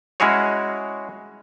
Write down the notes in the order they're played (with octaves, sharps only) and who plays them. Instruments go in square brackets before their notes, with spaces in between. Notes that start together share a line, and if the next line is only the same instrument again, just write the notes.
[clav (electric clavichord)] G#3 C#4 E4 F#4 G#4 C#5